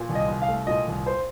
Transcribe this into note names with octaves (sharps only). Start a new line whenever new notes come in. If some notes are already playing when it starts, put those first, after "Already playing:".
Already playing: A#2
C2
D#5
C2
F5
A3
A#2 D#5
C2
C5